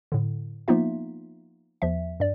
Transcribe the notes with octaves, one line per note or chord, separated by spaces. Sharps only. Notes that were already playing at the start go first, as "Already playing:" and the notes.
A2 D3
F3 A#3 B3 D#4 F4 E5
E2 F3 E5
G2 D5